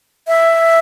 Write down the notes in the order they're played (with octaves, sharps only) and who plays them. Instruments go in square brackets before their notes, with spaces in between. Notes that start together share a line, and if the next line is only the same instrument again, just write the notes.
[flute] E5